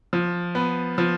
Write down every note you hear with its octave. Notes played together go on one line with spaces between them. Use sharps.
F3
B3
F3